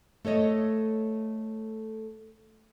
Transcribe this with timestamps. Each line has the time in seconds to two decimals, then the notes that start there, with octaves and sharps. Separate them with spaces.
0.25 A3 A4 C#5 D#5